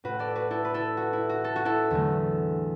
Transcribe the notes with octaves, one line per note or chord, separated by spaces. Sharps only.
A2 A3 F#4 B4
A4 D5
F#4 B4
E4 A4
B4
E4 A4
F#4
E4
F#4
A4
F#4
E4 A4
E2 D3 F#3 A3